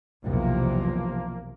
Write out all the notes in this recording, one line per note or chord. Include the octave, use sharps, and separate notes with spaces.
B1 E2 C3 F3 A#3